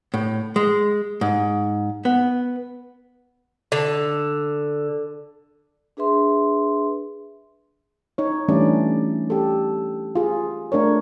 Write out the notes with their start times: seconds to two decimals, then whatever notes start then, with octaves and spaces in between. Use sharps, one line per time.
0.14 A2
0.56 G#3
1.21 G#2
2.05 B3
3.72 D3
5.97 D4 G#4 B4 E5 C6
8.18 D#4 C#5
8.48 E3 G3 A3 C#4 D4 D5
9.30 G4 A4
10.15 F4 G#4
10.72 A3 D4 A#4 C#5